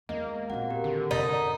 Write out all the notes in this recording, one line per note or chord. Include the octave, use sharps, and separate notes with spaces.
E2 G#3 A#3 D#5
A#2 B3 C4 F#4 F#5
G4 A#4
D3 D#3
F2 C3 D#4 A#4 A6 B6